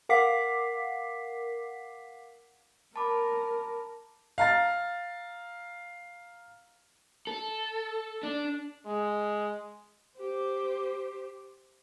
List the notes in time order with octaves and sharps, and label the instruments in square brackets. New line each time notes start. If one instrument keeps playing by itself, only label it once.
[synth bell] A#4 F5 F#5 D6 B6 C7
[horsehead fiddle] A#4 [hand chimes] A5 B5 D6
[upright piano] F5 A#5 A6
[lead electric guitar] A4
D4
[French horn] G#3
[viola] G4 C5